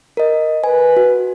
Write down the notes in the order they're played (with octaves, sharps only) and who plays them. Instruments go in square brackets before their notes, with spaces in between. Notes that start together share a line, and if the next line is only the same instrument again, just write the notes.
[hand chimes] A#4 D#5
[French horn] B4 [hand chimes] G#5
[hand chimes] F#4